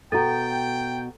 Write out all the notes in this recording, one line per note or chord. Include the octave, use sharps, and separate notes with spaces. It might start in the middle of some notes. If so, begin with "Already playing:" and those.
B2 F#4 A4 G5 A#5 A6